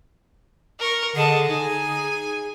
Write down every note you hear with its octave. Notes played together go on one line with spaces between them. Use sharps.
A#4 C#6
D3 G#4 D#5 A5
D#4 G#5